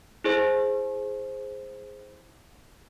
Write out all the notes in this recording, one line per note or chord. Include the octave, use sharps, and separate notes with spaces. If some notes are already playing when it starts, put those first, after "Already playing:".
E4 G#4 C5